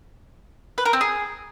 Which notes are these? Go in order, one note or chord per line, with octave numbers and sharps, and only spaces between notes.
B4
A#4
C4
G#4